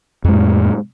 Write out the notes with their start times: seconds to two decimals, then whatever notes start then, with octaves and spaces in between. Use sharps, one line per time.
0.24 F2
0.28 G#3
0.32 A2